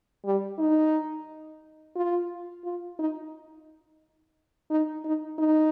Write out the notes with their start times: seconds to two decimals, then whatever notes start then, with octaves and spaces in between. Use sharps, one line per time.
0.25 G3
0.58 D#4
1.96 F4
2.65 F4
2.99 D#4
4.71 D#4
5.05 D#4
5.38 D#4